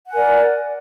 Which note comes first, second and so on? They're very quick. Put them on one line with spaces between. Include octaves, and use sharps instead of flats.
F#5 G#5 A#4 D5